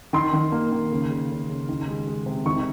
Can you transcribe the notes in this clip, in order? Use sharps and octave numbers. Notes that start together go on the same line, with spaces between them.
D#3 C6
D#3
A#3
D#3
C#3
C#3
C#3
C#3
D#3
G#3
G#3
C3
D#3 C#6